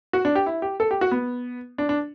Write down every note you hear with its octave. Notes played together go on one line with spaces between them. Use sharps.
F#4
D4
G4
E4
G4
A4
G4
F#4
B3
D4
D4